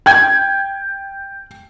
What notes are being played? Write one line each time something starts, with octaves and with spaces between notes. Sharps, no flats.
G5 G#6